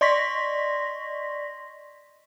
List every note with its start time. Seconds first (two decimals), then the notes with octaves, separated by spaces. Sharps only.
0.01 D5 D#5 C6 C#6 A#6 B6